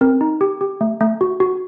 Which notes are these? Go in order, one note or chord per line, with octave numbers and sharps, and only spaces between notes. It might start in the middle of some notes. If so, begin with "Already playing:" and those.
C4 A#4
D#4
G4
G4
A3
A3
F#4
F#4